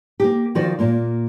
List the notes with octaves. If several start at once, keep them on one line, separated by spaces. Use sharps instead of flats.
A#3 G4
D#3 F3 F#4 A#4 D5
A#2 A#3 F4